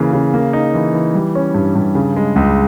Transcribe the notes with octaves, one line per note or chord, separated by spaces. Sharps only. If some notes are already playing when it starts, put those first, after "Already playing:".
Already playing: C#3 E3 A#3
C#3
A#3
D#4
E3
E3
G3
C#4
G2
G2
C#3
G#3
C#2